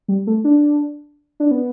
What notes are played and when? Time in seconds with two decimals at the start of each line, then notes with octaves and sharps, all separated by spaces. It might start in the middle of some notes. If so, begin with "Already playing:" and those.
0.08 G3
0.27 A3
0.44 D4
1.40 D4
1.51 B3